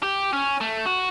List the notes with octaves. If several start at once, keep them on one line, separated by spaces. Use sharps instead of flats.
G4
C#4
A3
F#4